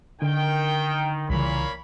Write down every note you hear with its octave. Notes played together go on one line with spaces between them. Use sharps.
D3 D#3 G5
C2 A#2 C#3 E3 A#3 C#5 B5